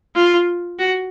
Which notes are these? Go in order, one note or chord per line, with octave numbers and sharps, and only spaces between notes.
F4
F#4